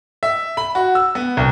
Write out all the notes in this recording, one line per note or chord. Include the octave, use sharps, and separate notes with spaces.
E5
B5
F#4
E6
B3
C2